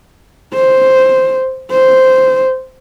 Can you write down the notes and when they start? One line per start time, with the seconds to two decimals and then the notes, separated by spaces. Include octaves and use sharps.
0.54 C5
1.71 C5